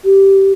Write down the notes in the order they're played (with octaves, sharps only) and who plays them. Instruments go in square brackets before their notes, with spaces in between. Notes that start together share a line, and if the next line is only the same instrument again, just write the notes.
[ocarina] G4